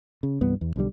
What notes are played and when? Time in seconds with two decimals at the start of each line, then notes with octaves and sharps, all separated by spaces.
0.23 C#3
0.41 C2 G2 E3 B3
0.61 E2
0.76 B1 D3 F3 G3